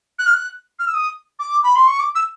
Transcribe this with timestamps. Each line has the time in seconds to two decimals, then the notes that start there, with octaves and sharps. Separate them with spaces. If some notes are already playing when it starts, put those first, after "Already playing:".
0.19 F#6
0.26 F6
0.34 F#6
0.79 F6
0.87 E6
0.94 D#6
1.39 D6
1.63 B5
1.75 C6
1.87 C#6
1.99 D6
2.15 E6